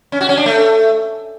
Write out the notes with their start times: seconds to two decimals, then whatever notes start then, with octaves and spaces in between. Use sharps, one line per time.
0.12 C#4
0.21 F#4
0.29 C#4
0.37 D4
0.46 A3